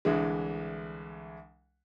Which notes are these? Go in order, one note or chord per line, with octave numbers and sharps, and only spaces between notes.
C2 D3 E3 G#3